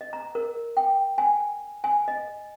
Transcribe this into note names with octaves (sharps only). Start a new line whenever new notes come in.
D#5
A#5
A#4
G5
G#5
G#5
D#5